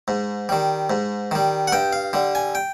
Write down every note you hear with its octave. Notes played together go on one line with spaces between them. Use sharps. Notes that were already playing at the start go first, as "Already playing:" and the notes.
G#2
D#3 G3
G#2
D#3 G3
F#5
G2 G5
F5
D3 G3
G#5
G5